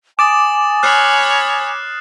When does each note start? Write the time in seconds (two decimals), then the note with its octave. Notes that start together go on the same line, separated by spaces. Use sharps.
0.19 G#5 D6 D#6 A6 E7
0.83 C#5 B5 F6 F#6 C7